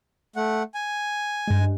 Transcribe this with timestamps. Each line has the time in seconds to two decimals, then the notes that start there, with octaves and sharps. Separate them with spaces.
0.36 A3 F#5
0.74 G#5
1.47 G2 G#3